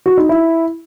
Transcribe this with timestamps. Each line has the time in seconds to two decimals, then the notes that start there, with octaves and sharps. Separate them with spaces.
0.06 F#4
0.17 D#4
0.29 E4